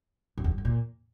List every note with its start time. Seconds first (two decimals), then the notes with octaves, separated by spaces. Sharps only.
0.38 F#2
0.44 E2
0.51 G2
0.58 F2
0.65 A#2